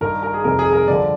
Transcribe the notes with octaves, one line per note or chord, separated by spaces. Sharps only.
G2 D#3 A#4
A#4
G#4
F2 C3 D#3 A#4
G#4
A#4
G2 D3 F3 D5